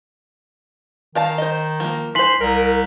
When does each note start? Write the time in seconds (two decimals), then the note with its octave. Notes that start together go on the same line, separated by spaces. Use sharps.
1.15 D#3 A#4 F5 A5
1.38 C5 D#5
1.80 F3 A#3
2.15 E3 C5 C6 B6 F#7
2.41 C2 A#4